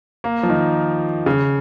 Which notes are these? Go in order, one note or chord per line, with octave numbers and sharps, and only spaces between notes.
A#3
F3
D#3
C#3